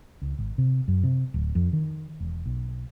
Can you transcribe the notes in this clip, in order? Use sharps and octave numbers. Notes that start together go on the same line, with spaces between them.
C#2
G#1
C3
F#2
C3
D1
F2
D#3
E1
B1